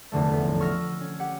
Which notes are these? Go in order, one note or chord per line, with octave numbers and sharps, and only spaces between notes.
F1 E2 D3 A3
B3
A1
C#6 E6 F6 A#6
C#4
G4 F#5